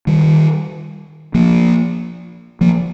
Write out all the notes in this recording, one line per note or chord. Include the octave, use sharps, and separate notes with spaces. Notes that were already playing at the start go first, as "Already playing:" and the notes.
D#3 G3
F3 A#3
F3 A#3